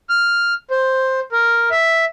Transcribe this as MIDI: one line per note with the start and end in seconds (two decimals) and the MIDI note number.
0.09 0.54 89
0.70 1.20 72
1.32 1.69 70
1.71 2.05 76